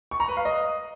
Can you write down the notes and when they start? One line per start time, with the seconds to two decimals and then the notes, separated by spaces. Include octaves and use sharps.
0.11 C#6
0.20 A#5
0.28 B4
0.37 F5
0.45 D#5